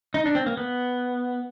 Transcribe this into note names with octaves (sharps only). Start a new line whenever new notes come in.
D#4
D4
C4
A#3
B3